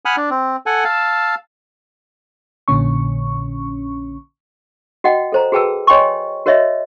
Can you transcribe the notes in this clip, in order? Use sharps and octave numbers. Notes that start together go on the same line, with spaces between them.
F#5 G#5 B5 D#6 F6
D4
C4
A4 F#5 G#5
F5 A5 E6
A#1 A#2 D3 C#4 C#6
F#4 D#5 F#5 G5
A4 C5 A#5
F#4 G#4 B4 G5 A5 E6
C#5 D#5 G5 G#5 C6 C#6
F#4 A#4 C#5 D#5 E5